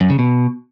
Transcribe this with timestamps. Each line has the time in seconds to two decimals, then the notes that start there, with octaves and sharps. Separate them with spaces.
0.01 F#2
0.10 C#3
0.19 B2